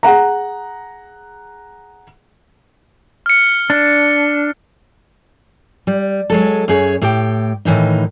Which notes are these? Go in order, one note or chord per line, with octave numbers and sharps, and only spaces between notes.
G#4 F#5 A#5
F6 C#7
D4
G3
F#3 G#3 A4
F#2 G#4 C#5
A2 G4 G5
A2 D#3 E3 D#4